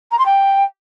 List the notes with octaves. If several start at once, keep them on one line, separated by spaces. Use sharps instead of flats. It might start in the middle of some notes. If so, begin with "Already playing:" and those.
A#5
C6
G5